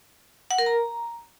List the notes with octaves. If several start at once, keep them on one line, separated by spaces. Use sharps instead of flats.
F#5
A#4
A#5